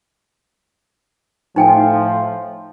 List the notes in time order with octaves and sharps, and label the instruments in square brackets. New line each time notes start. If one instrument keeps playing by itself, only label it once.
[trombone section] A2 F3 [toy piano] D#4 G5 G#5